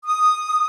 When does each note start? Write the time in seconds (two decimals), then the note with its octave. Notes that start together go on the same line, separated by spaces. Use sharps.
0.05 D#6